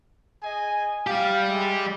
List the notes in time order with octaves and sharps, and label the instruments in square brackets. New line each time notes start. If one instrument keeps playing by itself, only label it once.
[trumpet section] G#4 D#5 G#5
[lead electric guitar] G3 G4 [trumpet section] F5
[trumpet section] G#3 E5